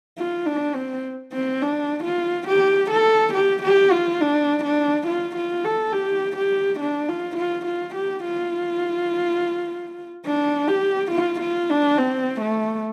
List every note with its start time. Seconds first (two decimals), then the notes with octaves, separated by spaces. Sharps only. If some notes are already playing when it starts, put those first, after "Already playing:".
0.18 F4
0.46 D4
0.74 C4
1.33 C4
1.62 D4
2.04 F4
2.48 G4
2.91 A4
3.34 G4
3.63 G4
3.92 F4
4.21 D4
4.64 D4
5.07 F4
5.36 F4
5.65 A4
5.93 G4
6.37 G4
6.80 D4
7.09 F4
7.37 F4
7.66 F4
7.95 G4
8.24 F4
10.26 D4
10.68 G4
11.11 F4
11.41 F4
11.70 D4
11.98 C4
12.41 A3